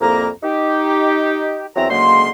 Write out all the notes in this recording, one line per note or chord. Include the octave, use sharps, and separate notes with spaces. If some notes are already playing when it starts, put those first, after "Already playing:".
C2 F2 A#3 A#5
D#4 G4
E2 F#3 C4 E5 A#5
D2 C#3 F#3 G#3 A#3 C6